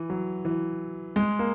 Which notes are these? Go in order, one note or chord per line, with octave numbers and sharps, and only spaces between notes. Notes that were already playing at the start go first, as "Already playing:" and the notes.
Already playing: E3
F#3
E3
G#3
A#3